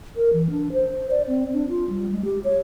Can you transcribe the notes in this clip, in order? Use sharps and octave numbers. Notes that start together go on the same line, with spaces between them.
A#4
E3
D4
C5
D5
C4
D4
F4
G3
G#3
G4
C#5